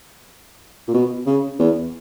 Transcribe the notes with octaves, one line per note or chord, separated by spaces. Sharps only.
A#2
B2
C#3
E2